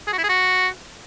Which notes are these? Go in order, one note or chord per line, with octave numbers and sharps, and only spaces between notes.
G#4
F#4
E4
G#4
F#4